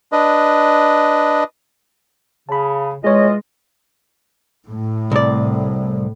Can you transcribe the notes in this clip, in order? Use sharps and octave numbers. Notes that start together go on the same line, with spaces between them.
D4 B4 D#5
C#3 A5 B5
E3 G#3 F4 G#4 C#5 D#5
A2
C2 D5